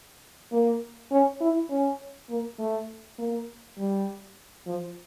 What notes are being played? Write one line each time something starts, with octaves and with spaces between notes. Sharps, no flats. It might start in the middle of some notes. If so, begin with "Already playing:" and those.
A#3
C#4
E4
C#4
A#3
A3
A#3
G3
F3